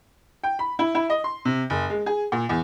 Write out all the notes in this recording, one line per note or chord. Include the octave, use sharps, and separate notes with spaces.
G5
B5
E4
E4
D#5
C6
C3
F#1
G#3
G#4
A#2
E2